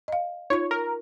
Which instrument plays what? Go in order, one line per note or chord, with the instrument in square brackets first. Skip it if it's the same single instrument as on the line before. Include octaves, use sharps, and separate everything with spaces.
[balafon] D#5 F5
[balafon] D#4 F4 C#6 [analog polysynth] C#5
[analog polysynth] A#4